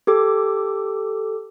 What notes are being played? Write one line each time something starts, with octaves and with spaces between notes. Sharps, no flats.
G4 A4 D6